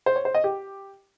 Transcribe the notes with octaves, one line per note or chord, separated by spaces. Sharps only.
C5
C#5
C5
D#5
G4